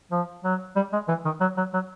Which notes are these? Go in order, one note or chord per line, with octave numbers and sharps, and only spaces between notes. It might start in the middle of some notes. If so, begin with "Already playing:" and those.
F3
F#3
G3
G#3
E3
D#3
F#3
F#3
F#3